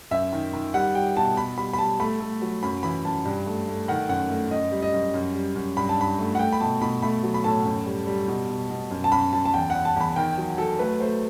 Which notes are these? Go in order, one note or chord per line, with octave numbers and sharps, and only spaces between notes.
F#2 E5
D#3
D#3
G3 F#5
G3 G5
B2 A5
B2 B5
G3 B5
B5
G3 A5
A3 B5
A3
F#3
F#2 B5
E3 B5
F#2 A5
G2
A3
A3
D#3 F#5
F#2 F#5
A3
F#2 D#5
G3
D#5
F#2
F#2
G3
F#2
G2 B5
A5
G2 B5
A3
F#5
A3 G5
B5
B2 A5
B2 B5
A3 B5
F#3
B5
A2 A5
F#2
G3
G3
B2
B2
B2
F#2
A5
F#2 B5
F#2 A5
A5
E2 G5
E2 F#5
A5
E2 B5
D#3 G5
F#3
F#3 A4
A3 B4
A3 C5